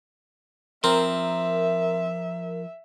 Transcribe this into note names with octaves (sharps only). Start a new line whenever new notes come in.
F3 C4 A#4 E5